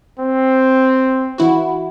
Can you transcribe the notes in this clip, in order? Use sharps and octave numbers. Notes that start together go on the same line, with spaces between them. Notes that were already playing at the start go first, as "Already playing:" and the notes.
C4
E3 E4 F#4